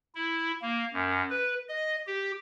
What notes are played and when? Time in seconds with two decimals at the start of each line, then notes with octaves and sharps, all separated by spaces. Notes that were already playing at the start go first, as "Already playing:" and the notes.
0.15 E4
0.62 A#3
0.94 F#2
1.30 B4
1.69 D#5
2.07 G4